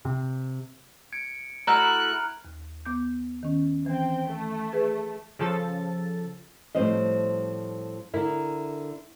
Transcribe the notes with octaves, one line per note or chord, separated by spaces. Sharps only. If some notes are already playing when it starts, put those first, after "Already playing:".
C3
G#6 C#7 D7
A3 E4 F#4 A#5 F6 F#6
D#2
B3 D6 G6
D#3 C#4
E3 C4 G5
A3
G#4 B4
C#3 F3 A4 A6
A2 F3 G3 G#3 C4 D#5
D3 E4 A#4